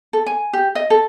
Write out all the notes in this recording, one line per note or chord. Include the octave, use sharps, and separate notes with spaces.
A4
G#5
G4
D#5
A4